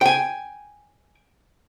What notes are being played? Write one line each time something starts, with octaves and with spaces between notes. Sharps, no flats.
G5 G#5